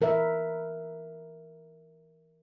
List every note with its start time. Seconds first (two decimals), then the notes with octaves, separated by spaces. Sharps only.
0.01 E3 A#4 B4 E5